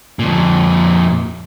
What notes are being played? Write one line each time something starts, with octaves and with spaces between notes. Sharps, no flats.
F2 A#2